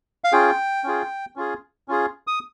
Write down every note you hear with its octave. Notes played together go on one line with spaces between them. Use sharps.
F5
C#4 F4 G#4 G5
C#4 F4 G#4
C#4 F4 G#4
C#4 F4 G#4
D#6